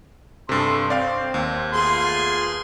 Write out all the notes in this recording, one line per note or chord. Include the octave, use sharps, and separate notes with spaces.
G2 C3 G#4 A4 C6
C4 D5 F5
D#2
A3 B3 F4 G#4 C6